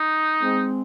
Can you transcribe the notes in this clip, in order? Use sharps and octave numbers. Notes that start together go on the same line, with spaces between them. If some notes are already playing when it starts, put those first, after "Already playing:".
Already playing: D#4
G#3 C4